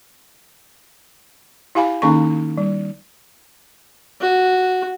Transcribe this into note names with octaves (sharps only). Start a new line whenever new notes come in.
E4 G4 F5 G#5 B5
D#3 A#3 C#4 D#4 C#6
G3
F#4